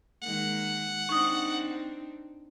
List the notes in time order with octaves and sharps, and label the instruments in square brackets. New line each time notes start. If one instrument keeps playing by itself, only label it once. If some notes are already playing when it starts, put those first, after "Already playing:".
[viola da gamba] D#3 G#3 A#3 [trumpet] F#5
[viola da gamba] C4 D4 D#4 [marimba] C#6 D#6